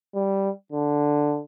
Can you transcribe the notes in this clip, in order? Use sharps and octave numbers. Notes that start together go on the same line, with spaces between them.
G3
D3